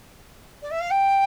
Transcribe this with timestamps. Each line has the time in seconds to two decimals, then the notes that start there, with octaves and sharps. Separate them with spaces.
0.62 D5
0.71 E5
0.80 F5
0.90 G5